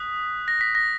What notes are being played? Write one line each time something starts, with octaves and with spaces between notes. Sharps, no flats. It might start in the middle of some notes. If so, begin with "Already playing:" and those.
Already playing: D#6 F#6 B6
A#6
B6
A#6